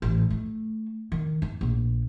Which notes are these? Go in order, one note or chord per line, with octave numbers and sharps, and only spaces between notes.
A1
A3
D#3
D4
A#1